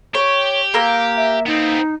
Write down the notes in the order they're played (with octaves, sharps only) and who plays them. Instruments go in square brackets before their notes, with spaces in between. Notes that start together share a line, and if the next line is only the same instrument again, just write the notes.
[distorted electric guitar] G4 [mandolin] C#5
[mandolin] A#3 A#4 E6
[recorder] E5
[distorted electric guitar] B3 C4 [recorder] D#4